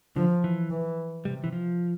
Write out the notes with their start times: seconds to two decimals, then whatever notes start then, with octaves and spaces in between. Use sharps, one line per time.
0.16 D3 F3
0.44 E3
0.70 E3
1.25 C3 G3
1.44 E3
1.52 F3